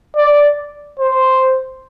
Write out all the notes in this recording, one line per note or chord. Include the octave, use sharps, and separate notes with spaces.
D5
C5